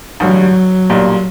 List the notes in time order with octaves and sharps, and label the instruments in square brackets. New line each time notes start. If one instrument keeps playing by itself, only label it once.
[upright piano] A1 G2 D3 G3 [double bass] F#3
[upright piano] B1 A#2 G3